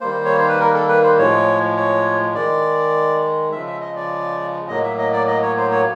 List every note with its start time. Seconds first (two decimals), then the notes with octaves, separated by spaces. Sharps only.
0.01 D#3 G3 A#3 C5
0.25 C#5
0.36 C5
0.48 B4
0.60 A#4
0.74 A4
0.89 B4
1.03 C5
1.18 A2 F3 G#3 C#5
1.76 C#5
2.35 D#3 G#3 D5
3.52 C#3 F3 G#3 E5
3.66 E5
3.81 D#5
3.96 D5
4.68 A2 F#3 A#3 D#5
4.83 E5
4.98 D#5
5.13 D5
5.27 D#5
5.42 C#5
5.57 C5
5.71 C#5